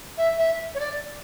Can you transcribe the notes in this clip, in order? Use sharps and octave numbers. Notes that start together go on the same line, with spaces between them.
E5
E5
C#5
D5